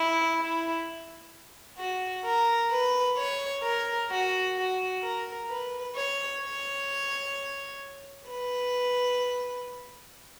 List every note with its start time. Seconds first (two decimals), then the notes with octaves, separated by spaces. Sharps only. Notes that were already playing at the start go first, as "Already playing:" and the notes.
Already playing: E4
0.39 E4
1.78 F#4
2.25 A#4
2.71 B4
3.17 C#5
3.64 A#4
4.11 F#4
4.56 F#4
5.03 A#4
5.49 B4
5.96 C#5
6.42 C#5
8.28 B4